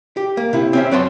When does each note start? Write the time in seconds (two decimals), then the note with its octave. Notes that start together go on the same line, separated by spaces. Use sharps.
0.17 G4
0.37 A#3
0.53 C3 E4
0.73 C4 C#4 E5
0.91 F#2 B4 C#5 F#5 A5 C6